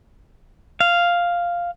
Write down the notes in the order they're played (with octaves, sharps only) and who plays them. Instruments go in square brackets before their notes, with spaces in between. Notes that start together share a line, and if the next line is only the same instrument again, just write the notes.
[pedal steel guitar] F5